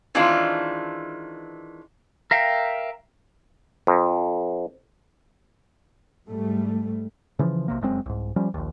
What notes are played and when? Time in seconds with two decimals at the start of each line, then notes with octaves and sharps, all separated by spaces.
0.15 D#3 E3 G#3 C4 D4 F4
2.31 A#4 E5 F5 G5
3.87 F2
6.28 G#2 G3 A3
7.39 C#3 E3 F3
7.68 B1 C3 A#3
7.81 F1 F#2 G#3 C4
8.06 C2 G#2
8.36 F3 G3 C#4
8.54 A#1 D#2